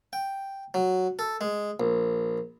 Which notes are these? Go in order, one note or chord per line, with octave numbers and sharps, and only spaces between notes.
G5
F#3
A4
G#3
A#1